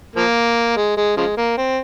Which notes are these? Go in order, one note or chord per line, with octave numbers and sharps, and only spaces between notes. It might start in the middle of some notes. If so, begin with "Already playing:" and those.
F3 A#3
G#3
G#3
C#3 F3 G#3
A#3
C4